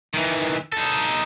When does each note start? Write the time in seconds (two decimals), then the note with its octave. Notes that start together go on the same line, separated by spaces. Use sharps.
0.14 D#3 E3
0.72 D#4 A4